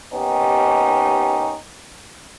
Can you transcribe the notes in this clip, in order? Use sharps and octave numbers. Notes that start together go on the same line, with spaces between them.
D#2 B3 C#4 D#4 G4